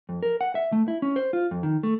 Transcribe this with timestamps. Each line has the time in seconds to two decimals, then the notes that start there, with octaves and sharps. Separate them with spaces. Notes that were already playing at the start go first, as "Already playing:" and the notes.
0.09 F2
0.23 A#4
0.41 F#5
0.55 E5
0.72 A3
0.88 E4
1.02 C#4
1.16 C5
1.33 F4
1.51 F2
1.63 D#3
1.83 A3